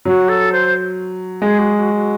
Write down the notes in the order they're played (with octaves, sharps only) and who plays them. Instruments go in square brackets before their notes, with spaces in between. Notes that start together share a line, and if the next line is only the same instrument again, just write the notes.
[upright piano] F#3 [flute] F#4
[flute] A4
C5
[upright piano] G#3 [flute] G#4
[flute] F#4
F#4
F#4